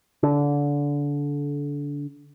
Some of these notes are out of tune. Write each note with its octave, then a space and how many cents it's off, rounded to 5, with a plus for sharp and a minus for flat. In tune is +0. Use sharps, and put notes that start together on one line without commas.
D3 -25